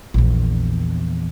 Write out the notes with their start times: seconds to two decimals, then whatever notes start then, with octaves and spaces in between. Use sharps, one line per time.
0.14 A#1 E2